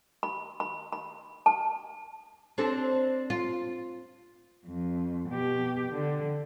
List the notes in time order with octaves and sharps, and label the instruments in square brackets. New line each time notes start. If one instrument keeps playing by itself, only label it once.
[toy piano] B5
B5
B5
A5
[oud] C4 D4 A4
F4
[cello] F2
B2 G4
D3